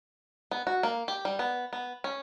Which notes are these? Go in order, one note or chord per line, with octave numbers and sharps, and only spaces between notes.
B3
F#4
A#3
G4
G3
B3
B3
C#4